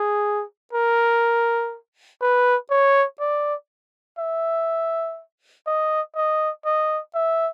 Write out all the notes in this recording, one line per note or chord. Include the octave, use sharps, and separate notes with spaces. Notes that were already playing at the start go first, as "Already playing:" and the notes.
Already playing: G#4
A#4
B4
C#5
D5
E5
D#5
D#5
D#5
E5